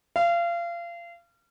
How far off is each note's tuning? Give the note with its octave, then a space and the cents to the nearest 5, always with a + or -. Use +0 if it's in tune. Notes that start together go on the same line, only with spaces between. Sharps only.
F5 -30